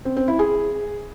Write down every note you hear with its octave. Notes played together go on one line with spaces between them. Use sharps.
C4
C4
E4
G#4